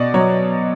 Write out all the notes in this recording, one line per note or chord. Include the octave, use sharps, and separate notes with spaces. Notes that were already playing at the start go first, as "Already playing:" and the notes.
Already playing: B2 D5 D#5
F#3 C#5